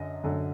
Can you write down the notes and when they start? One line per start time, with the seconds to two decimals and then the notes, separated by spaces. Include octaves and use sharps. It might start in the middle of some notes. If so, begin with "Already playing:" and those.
Already playing: F#2 D3 D#5
0.23 F#2 D3